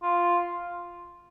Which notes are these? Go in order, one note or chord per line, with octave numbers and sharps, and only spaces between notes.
F4